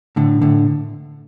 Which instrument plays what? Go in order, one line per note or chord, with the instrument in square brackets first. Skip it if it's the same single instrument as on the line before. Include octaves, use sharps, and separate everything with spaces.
[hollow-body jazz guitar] A2 D3
A2 D3